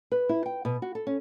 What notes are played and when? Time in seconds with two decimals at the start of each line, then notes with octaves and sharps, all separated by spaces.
0.12 B4
0.29 E4
0.46 G5
0.65 B2
0.82 F#4
0.95 A4
1.07 C#4